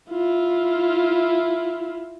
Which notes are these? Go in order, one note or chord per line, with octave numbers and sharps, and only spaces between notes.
E4 F4